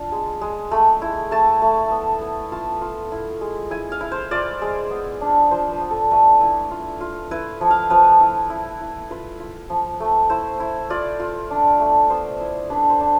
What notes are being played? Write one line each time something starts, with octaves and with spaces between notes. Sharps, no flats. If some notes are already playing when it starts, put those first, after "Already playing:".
Already playing: D4 F4 A5
G#3
G#3
A3 B5
E4
A3 A5
A3
B3
B3
F4 A5
F4
E4
G#3
E4 G#5
F5
E4
C5
F4 D5
G#3
B3
D4
F3 C5
B4
B3
A4
A3 B4
E4
F4
F4
E4 B4
F3
F5
F3 B4
E4
E4
E4
F4 B4
F4
F3
A3
E4 C5
E4
F4 D5
F4
D4
A3
B3 C5
E4
D4 B4
C5
D4